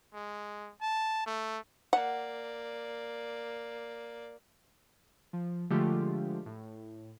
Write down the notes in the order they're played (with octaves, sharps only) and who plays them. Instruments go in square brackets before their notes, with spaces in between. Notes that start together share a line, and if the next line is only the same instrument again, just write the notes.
[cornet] G#3
A5
A3
[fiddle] A#3 D5 [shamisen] F#5
[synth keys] F3
D3 F3 G#3 A3 F4 G4
A2